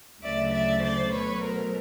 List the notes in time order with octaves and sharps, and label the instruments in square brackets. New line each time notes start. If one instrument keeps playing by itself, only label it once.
[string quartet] D2 C#3 F#3 A3 D5 E5
D5 E5
C5 D5
B2 F#3 A3 B4 C#5
A#4 C5